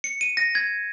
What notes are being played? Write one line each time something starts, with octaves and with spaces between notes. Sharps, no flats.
C#7
D#7
A#6
G#6